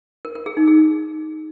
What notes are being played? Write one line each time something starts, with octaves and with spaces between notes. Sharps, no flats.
A#4
A#4
G#4
D#4
G#4